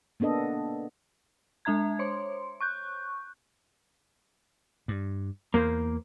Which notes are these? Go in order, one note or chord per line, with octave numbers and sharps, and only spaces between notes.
A#3 B3 D4 A4 D#5
G#3 D4 E5 A#5 G#6
C5 C#5 C6
C#6 F#6 G6
G2
E2 A#3 A#4 C5